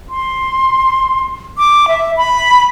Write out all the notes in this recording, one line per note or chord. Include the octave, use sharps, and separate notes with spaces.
C6
D6
E5
B5